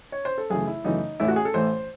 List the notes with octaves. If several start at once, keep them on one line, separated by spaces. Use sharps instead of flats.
C#5
C5
A4
F#2 C#3 E3 A3 G#4
E4
F#2 C#3 E3 A3 D#4
A1 A2 E3 A3 E4
F#4
G#4
A4
A1 A2 E3 A3 C5